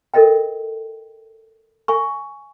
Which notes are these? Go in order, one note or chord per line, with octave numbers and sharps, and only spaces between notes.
A4 A#4 D#5 E5 G5
E5 G#5 C#6